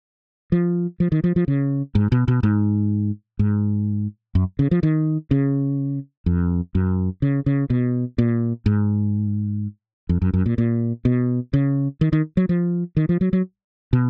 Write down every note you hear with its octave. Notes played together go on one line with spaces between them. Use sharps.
F3
F3
D#3
F3
F3
C#3
G#2
B2
B2
G#2
G#2
F#2
C#3
F3
D#3
C#3
F2
F#2
C#3
C#3
B2
A#2
G#2
F2
F#2
F#2
A#2
A#2
B2
C#3
D#3
D#3
F#3
F3
D#3
F3
F#3
F#3
B2